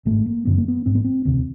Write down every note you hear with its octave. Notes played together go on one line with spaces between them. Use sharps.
G#1 G#2 A3
A#3
G1 F#2 D3 B3
A#3
B3
A1 G#2 C4
B3
C4
E1 D2 C3 C4